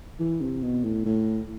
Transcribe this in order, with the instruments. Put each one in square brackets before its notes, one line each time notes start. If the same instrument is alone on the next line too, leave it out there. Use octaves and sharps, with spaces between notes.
[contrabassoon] E3
C3
B2
A2
A2